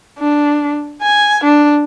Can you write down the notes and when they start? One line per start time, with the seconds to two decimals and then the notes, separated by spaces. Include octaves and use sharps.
0.20 D4
1.02 G#5
1.44 D4